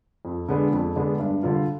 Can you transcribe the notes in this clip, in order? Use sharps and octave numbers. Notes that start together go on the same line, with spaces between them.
F2
D3 G#3 B3 D4
F2
D3 G#3 B3 D4
G2
D3 G3 D4 F4